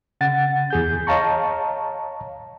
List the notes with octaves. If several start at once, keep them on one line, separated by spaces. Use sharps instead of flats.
C#3 F#5 A6
E2 G#4 G6
C#5 D#5 F5 A5 A#5 C#6